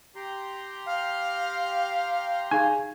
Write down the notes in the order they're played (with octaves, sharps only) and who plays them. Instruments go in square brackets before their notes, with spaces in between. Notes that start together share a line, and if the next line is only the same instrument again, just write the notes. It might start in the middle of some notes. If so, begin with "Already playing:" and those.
[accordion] G4 A#5 C6
[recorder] F5
[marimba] D#4 G#4 F5 [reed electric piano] G#5